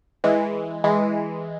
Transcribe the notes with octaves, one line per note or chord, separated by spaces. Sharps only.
E3 G#3
E3 G#3